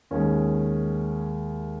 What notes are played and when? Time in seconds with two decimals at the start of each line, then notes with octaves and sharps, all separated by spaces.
0.11 D#2 D#3 G#3 C#4